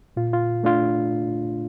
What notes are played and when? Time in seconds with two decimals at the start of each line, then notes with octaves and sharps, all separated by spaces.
0.16 A#2 F4
0.33 F4
0.64 A3 D4 F4